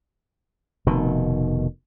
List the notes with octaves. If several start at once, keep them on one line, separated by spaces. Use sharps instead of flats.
F1 B2 D#3